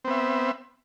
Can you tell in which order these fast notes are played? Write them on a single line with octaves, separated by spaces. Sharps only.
C4 B3 E5